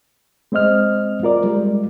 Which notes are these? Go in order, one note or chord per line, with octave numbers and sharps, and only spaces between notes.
G#3 C4 C5 D#5 F6
F4 A#4 D5
G3 G#3